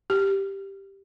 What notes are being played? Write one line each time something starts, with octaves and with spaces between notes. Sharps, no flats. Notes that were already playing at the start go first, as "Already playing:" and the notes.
G4